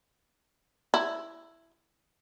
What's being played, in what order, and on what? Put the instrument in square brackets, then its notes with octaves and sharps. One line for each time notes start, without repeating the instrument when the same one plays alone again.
[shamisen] E4